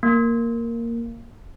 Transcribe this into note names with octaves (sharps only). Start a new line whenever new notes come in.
A#3